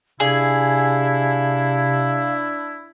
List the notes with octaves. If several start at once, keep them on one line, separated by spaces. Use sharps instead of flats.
C3 D4 E4 G#4 F5